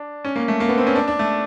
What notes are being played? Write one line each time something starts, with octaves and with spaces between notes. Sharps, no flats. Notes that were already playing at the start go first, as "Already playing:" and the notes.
Already playing: D4
C#4
A#3
A3
A#3
B3
C4
C#4
D4
D4
A3